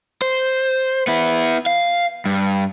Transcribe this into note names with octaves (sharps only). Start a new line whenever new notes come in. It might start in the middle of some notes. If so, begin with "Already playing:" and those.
C5
B3 E4
F5
G2